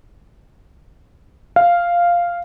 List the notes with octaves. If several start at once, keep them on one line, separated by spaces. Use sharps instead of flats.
F5